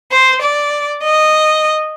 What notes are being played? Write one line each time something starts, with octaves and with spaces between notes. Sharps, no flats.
C5
D5
D#5